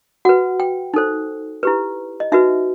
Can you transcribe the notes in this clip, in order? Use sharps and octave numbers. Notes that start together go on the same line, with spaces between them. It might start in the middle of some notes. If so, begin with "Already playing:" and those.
F#4 B4 F#5
G5
D#4 A4 C5
E4 G4 B4
D#5
D#4 F#4 B4 E5